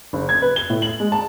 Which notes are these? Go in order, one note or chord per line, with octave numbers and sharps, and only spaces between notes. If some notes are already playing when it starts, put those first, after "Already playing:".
F#1
G#6
B4
G7
A2
F#7
G#3
A5